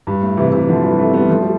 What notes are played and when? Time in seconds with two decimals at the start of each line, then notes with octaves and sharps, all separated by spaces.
0.07 G2
0.22 A2
0.37 C3 E3
0.52 C3 E3
0.68 D3 F3
0.83 E3 G3
0.99 A3 C4
1.13 G3 B3
1.29 F3 A3
1.43 G3